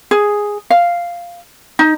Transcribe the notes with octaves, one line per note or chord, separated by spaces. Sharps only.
G#4
F5
D#4